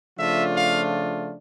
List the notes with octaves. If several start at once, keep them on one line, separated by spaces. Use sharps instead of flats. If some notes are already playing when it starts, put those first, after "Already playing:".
C#3 F3 A3 D4 F4 E5
F5